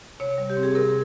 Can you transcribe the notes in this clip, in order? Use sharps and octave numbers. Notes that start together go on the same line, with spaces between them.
C3 C#5
G3
G4
C4
G#4
C3 A#4